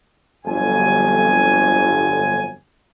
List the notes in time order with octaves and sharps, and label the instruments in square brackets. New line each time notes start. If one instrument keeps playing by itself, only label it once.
[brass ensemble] G1 F2 F#3 G#5